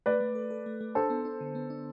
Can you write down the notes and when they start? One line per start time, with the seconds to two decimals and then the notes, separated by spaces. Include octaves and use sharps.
0.06 A3 B4 D5
0.20 A3
0.35 A4
0.50 A4
0.66 A3
0.81 A3
0.95 D4 A4 C5
1.10 B3
1.25 D4
1.41 D3
1.55 B3
1.70 D4